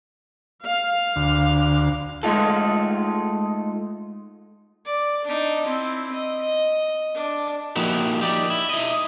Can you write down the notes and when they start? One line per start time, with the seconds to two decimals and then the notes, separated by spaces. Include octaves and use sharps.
0.63 F5
1.16 D2
2.23 G#3 A3 D#4 F4 A4
4.85 D5
5.25 D4 D#4
5.65 C4 E4
6.12 D#5
6.41 D#5
7.14 D4
7.76 F3 A#3 D#4 E4 F#4 G4
8.21 D#4 G4 D5
8.50 E4
8.70 E4 D#5